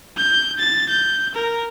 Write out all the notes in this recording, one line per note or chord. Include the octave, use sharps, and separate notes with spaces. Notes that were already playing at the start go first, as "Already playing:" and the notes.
G6
A6
G6
A#4